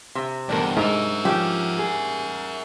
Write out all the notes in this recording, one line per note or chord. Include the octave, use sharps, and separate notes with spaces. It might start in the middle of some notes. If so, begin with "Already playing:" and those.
C3
E2 G2 D4 A#4
G#2 A#4 E5
F3 C#4 G4 G5
G#4